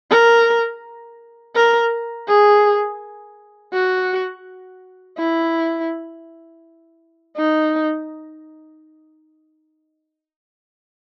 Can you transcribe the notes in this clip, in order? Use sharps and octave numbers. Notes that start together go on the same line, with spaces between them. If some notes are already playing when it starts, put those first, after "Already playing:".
A#4
A#4
G#4
F#4
E4
D#4